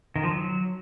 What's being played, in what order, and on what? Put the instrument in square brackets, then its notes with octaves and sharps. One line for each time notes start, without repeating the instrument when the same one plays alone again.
[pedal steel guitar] D#3
F3
F#3